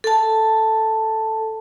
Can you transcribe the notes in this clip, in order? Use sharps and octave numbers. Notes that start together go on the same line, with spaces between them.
A4 A5